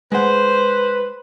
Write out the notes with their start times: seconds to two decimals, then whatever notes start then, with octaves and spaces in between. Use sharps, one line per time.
0.12 G#3 B4 C5 F#5